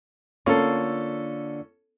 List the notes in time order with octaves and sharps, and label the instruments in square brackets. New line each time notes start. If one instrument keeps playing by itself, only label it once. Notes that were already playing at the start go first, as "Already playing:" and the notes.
[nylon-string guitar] D3 A#3 F4 [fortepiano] C#4 A4